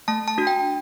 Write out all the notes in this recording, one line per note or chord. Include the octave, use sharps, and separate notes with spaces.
A3 A5
A5
D4 F#4
G5